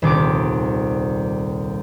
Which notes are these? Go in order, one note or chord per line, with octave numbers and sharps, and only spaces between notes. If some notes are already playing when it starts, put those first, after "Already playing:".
D#1 C2 D6 D7